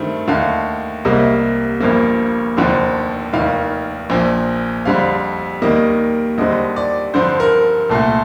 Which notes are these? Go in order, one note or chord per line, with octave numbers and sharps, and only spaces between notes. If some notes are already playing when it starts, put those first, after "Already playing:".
Already playing: G2 D#3 A3 C4
D#2 D3 A3 F5
C2 C3 G3 A#3 D#5
G1 G2 F3 A#3
F1 D#2 D3 F3 C4
F1 D#2 D#3 F5
A#1 A#2 F3
F2 D3 G3 C4 F5
D#2 D#3 G3 A#3 D#5
D#2 D3 G3 C4 D#5
D5
G2 D3 F3 C4 C5
A#4
C2 A#2 A3 A4